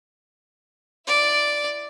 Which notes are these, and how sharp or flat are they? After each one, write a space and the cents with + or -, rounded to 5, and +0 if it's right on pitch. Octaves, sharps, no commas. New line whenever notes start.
E4 +20 D5 +0